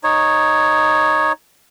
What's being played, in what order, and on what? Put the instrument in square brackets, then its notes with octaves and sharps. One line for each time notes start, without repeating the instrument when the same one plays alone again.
[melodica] D#4 C#5